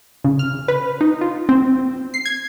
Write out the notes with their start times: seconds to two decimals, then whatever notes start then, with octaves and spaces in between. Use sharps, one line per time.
0.24 C#3
0.39 F6
0.68 B4
1.01 D#4
1.21 F4
1.49 C4
2.14 C7
2.25 G#6